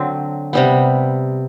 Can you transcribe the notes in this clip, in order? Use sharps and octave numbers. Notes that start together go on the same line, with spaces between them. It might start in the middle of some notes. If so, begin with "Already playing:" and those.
Already playing: D3 F#3 C4
C3 G3 B3